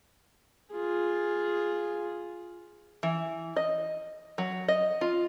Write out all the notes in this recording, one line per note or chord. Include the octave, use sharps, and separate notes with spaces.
F4 G#4
E3
D#5
F#3
D#5
F4